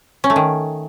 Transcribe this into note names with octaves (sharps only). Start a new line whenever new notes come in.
C#4
A3
D#3